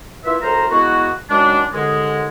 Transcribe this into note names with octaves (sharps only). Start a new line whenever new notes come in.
A#3 E4 F4 B4 E5
C2 F#2 A4 A#4 C5 A#5
G#3 A#3 B3 E4 F#4
D#3 F#3 G#3 C#4 D4
D#2 D3 G#3